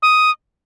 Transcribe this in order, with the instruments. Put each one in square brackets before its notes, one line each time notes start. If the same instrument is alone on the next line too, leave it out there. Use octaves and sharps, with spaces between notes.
[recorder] D#6